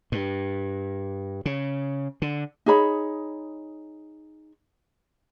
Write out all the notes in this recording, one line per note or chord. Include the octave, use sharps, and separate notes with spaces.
G2
C#3
D3
D#4 G#4 C#5 B5